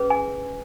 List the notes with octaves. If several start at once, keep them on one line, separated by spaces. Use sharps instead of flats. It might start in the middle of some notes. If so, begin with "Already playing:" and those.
Already playing: C#4 G#4 B4
G#5